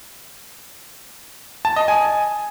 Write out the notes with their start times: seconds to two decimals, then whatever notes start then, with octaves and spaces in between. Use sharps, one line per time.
1.65 A5
1.76 D#5
1.88 G#5